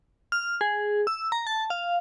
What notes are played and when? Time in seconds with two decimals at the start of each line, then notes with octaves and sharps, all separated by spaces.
0.32 F6
0.61 G#4
1.07 E6
1.32 A#5
1.47 A5
1.70 F5